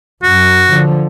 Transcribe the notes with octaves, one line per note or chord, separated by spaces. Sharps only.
F#2 F#3 F#4
D3 F3